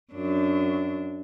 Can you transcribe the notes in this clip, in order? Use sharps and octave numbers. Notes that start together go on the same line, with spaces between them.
F#2 D4